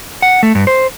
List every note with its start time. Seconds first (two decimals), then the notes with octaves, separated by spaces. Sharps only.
0.22 F#5
0.43 A3
0.55 G2
0.67 C5